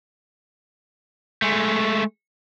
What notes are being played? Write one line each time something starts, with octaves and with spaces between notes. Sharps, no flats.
G#3 A3